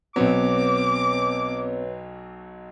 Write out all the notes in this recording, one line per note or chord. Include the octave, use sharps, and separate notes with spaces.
B1 F#3 B3 C4 B4 C#5 D6